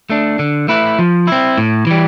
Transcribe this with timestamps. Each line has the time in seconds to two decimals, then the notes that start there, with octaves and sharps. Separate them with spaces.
0.10 A3 D4
0.39 D3
0.68 A3 E4 B4
0.99 F3
1.27 C4 E4
1.58 A2
1.87 E3 G3